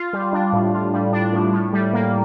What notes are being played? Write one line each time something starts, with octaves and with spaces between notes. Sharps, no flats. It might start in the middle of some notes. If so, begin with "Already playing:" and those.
Already playing: F4
G3
D4
A2
F4
G3
D4
A2
A2
G3
A#3